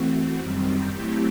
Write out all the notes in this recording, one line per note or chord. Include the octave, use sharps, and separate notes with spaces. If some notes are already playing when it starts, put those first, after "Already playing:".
Already playing: E3 A3 C4 F#4
F#2 D#3 G3 C4
F#3 A3 C4 E4 G4